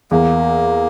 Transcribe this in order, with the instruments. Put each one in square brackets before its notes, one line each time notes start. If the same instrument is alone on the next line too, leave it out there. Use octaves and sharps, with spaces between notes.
[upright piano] E2 [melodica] A#3